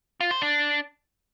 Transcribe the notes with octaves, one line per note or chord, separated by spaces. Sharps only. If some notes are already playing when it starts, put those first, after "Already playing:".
F4
C5
D4